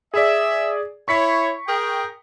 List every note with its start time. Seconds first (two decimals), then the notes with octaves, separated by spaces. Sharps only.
0.14 G#4 D5 E5
1.08 E4 C#5 C#6 B6 C#7
1.67 G#4 A#4 G5